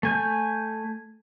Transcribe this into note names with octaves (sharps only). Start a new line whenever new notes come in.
A3 G#5 G6